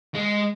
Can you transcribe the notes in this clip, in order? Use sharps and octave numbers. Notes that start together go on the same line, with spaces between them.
G#3